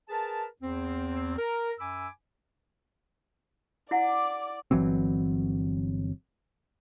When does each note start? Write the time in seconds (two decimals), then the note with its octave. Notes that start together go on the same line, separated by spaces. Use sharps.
0.08 G#4 A#4 B4 A5
0.60 E2 C4
1.37 A#4
1.78 F#2 G#5 B5 D6 E6
3.91 E4 D5 F#5 D6
4.71 G1 E3 F#3 C4